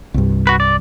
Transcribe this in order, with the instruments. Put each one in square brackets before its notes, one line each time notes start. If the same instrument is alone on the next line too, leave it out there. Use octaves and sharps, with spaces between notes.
[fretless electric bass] C2 G2
[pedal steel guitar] F#4 B4
D5